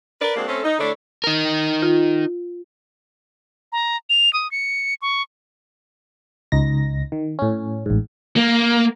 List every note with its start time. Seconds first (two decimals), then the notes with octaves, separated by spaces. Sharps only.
0.21 A#4 B4 D5
0.36 G#3 A#3 C4 D4 F#4 G#4
0.48 A3 C4 C#4 A4
0.64 D#4
0.79 D3 A3 D4 E4 C#5 D5
1.24 D#4 A#4
1.82 F4
3.72 A#5
4.10 F7
4.33 D#6
4.52 C#7
5.02 C#6
6.52 C#2 D#4 A#6
7.12 D#3
7.39 A2 C#4
7.86 A1 G#2
8.36 A#3